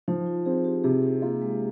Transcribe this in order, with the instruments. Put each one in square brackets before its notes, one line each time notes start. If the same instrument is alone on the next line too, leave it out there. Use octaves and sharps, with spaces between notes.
[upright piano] F3 [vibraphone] D#4
[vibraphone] F4
[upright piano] C4 [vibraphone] G#4
[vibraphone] G4
[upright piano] C3 [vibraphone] G#4
[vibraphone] G4
[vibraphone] A#3 [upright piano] F4
[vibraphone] G#3